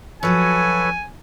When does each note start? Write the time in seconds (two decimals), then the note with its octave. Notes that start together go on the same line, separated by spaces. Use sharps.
0.23 F3 F#3 F#4 A4 B4 C#5 G#5